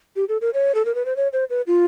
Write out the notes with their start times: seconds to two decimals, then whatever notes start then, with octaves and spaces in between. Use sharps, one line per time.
0.16 G4
0.29 A4
0.41 A#4
0.54 C#5
0.75 A4
0.85 A#4
0.95 B4
1.05 C5
1.16 C#5
1.33 C5
1.50 B4
1.67 F4